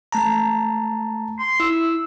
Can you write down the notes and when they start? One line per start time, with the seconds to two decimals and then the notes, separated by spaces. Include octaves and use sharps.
0.12 A3 A5 A#5
1.39 C6
1.60 E4 E6